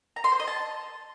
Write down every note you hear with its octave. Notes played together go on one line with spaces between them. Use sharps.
A#5
C6
C5
D#5
A5